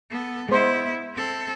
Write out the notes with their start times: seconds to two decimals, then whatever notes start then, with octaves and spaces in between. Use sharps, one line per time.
0.11 B3 A4
0.49 G#3 B3 E4 C5
1.14 C4 A4